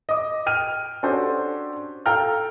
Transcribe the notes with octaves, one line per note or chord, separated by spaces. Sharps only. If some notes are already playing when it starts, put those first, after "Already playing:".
D#5 D6
G5 F6 D#7
C#4 D4 F#4 G4 A4 C5
A4 F5 G5 A#5 F6